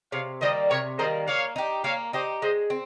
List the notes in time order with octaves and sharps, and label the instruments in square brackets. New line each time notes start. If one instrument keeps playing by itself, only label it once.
[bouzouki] C3 [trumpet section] C#5 F5
[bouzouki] D#3 G3 A#3 [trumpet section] C5 D#5
[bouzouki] C3 [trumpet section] A#4 C#5
[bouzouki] D#3 G3 A#3 [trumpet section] C5 D#5
[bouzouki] A#3 [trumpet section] C#5 F5
[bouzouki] D#4 G4
[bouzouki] A#3 [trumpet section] C#5 F5
[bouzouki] D#4 G4 [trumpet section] C5 D#5
[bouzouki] G#3 [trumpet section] C5 D#5
[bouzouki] C4